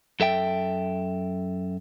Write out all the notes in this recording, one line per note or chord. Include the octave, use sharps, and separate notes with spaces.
F#2 A4 E5 G5